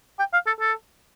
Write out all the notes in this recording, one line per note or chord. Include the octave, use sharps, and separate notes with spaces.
G5
F5
A4
A4